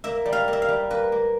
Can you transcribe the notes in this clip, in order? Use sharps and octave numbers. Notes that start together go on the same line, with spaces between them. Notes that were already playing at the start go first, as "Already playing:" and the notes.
A#3 E5
G3
F5
A#3
E5
F5
G3
A#3 B4
A#3